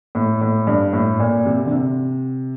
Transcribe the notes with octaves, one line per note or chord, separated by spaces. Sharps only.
A2
A2
G2
A2
A#2
C3
D3
C3